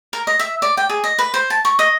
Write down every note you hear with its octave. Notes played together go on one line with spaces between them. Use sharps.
A#4
D#5
E5
D5
G5
G#4
D#5
B4
C5
A5
C#6
D#5